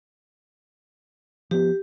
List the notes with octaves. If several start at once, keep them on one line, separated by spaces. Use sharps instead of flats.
F3 B3 G4